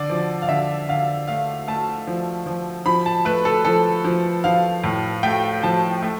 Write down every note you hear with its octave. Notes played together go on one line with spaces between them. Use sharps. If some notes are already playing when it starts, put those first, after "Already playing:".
Already playing: D3 D5
F3
F5
D3 E5
D3 F5
A3 F5
A3 A5
F3
F3
F3 B5
A5
A3 B4
A4
F3 A4
F3
F3 F5
A2
A3 G5
F3 A5
A3